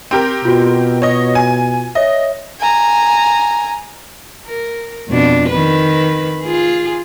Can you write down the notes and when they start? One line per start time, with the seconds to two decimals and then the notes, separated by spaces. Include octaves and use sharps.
0.11 C4 G4 A#4
0.45 B2 F4 F#4
1.02 C#5 D#5
1.35 G#5
1.95 C#5 D#5 E5
2.60 G#5 A#5
4.46 A#4
5.09 F2 B2 D4
5.49 D#3 B4
6.42 F4 G#4